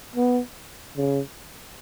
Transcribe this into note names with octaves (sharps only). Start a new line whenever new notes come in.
B3
C#3